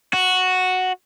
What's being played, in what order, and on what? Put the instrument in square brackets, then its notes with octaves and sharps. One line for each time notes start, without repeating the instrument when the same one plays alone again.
[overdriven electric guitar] F#4